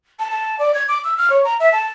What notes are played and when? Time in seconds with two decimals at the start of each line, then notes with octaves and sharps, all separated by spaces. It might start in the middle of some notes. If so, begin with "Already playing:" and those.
0.19 A5
0.31 A5
0.59 D5
0.74 G#6
0.88 D6
1.04 E6
1.18 F6
1.30 C#5
1.44 A#5
1.60 E5
1.72 A5